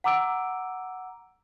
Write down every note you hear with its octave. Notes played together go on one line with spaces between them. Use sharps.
F#5 A#5 D6 E6 D7